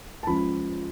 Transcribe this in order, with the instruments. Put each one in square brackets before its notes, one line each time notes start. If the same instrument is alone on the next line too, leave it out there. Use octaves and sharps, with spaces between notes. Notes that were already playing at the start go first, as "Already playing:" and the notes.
[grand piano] A5
C#2 C#3 F3 B5